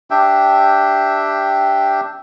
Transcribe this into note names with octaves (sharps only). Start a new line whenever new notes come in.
D4 G4 E5 G5